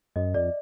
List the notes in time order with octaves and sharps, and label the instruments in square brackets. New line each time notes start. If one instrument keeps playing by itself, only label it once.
[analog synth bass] F#2 [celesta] D#5
[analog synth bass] F2 [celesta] D5